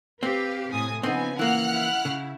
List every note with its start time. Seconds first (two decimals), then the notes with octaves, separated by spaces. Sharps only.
0.23 C4 G4 B4 F5
0.71 A2 C3 G#5 D#6
1.03 C#3 F3 B3 C4 D#4 G#5
1.39 E3 A#3 F#5 F6 F#6
1.72 E4
2.05 C#3